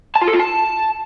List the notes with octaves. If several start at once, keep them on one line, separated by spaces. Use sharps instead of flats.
A5
F4
A4
F4
A5